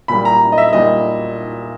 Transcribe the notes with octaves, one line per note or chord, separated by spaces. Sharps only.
A#2 G3 B5
A#5
D#5
E5
A#2 G3 D#5